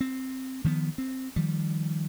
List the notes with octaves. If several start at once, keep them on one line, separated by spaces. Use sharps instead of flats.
C4
D#3 F3 A#3 B3
C4
D#3 F3 G3